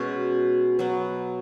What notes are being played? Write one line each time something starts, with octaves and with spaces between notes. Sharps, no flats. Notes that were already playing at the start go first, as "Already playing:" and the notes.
Already playing: B2 G#3 C#4
B2 F#3 B3